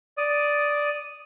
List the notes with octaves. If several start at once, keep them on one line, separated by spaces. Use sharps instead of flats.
D5 D#6